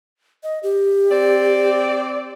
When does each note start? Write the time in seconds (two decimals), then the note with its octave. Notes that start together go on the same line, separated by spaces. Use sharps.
0.43 D#5
0.63 G4
1.10 C4 D5